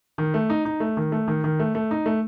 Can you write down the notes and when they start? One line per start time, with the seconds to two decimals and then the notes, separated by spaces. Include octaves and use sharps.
0.18 D#3
0.34 A3
0.50 D#4
0.65 D#4
0.80 A3
0.97 D#3
1.12 A3
1.28 D#3
1.44 D#3
1.60 A3
1.75 A3
1.91 D#4
2.06 A3